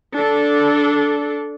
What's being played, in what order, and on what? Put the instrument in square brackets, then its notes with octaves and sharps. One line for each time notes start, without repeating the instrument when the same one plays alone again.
[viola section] D4 A4